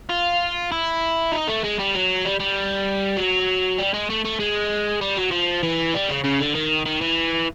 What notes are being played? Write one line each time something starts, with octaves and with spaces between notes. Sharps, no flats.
F4
E4
D#4
A3
G#3
G3
F#3
G3
G3
F#3
G3
G#3
A3
A3
G#3
G3
F#3
F3
E3
G3
C#3
C#3
D3
D#3
D#3
E3